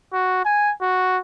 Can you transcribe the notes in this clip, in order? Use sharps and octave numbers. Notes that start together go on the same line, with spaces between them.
F#4
G#5
F#4